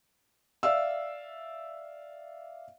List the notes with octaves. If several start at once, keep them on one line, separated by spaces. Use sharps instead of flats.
D5 E5 F5 E6